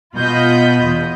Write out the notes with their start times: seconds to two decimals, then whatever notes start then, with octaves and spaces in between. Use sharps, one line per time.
0.15 B2 F4 D#5 B5 G6
0.84 E2